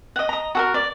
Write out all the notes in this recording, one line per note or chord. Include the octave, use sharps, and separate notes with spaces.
D#5 F#5
D#5 A#5
F#4 A4 A#4
D5